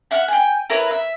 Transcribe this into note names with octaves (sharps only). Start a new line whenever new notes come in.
E5 F#5 F6
G5 G#5
E4 A#4 B4 C#5
E5